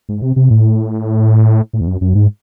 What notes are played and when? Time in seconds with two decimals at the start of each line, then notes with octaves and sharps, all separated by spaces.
0.09 G#2
0.22 C3
0.36 C3
0.50 A2
1.73 A2
1.81 E2
1.87 F#2
2.01 F#2
2.15 G#2